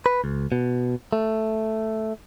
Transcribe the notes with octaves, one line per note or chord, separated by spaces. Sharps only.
B4
C#2
B2
A3